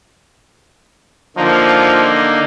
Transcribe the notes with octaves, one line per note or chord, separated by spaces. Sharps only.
D3 F3 A#3 D#4